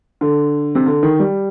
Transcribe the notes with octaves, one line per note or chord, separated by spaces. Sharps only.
D3
C3
D3
D#3
G3